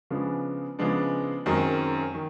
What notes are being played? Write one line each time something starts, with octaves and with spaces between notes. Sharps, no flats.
C#3 F3 G#3 B3 D4
C#3 F3 G#3 B3 D4
F#2 D#3 G#3 C4
D#3